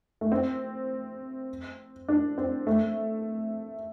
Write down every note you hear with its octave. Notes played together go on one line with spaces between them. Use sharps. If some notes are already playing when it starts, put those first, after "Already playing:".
A3
C4
D4
C4
A3